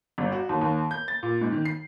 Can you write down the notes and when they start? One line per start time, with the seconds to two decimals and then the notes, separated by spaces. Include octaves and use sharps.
0.18 G1
0.32 F#4
0.49 D#2
0.61 D#2
0.91 G6
1.08 A6
1.23 A#2
1.41 G#2
1.52 D#3
1.65 C7